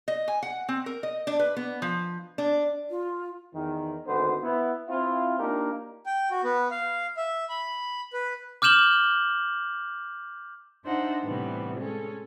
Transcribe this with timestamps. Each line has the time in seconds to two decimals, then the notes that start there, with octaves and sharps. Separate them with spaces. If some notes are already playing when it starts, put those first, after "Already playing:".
0.08 D#5
0.28 G#5
0.43 F#5
0.69 C4
0.86 A#4
1.03 D#5
1.27 D4
1.39 B4
1.56 B3
1.82 F3
2.38 D4
2.90 F4
3.54 E2 D#3
4.06 G#1 D2 D3 D#3 B3 C5
4.42 B3 E4
4.89 C4 E4 F4
5.39 A#3 D4 D#4 F4 G4 A#4
6.06 G5
6.31 F#4
6.44 B3
6.71 F5
7.17 E5
7.49 B5
8.13 B4
8.62 D6 F6 G6 E7 F#7 G7
10.83 D4 D#4 C5 E5 F#5
11.23 A2 C3 E3 G3 B3
11.78 G#3 C#4 A4